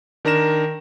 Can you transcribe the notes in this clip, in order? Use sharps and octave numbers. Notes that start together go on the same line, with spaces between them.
D#3 D4 A#4 A#5 A#6 E7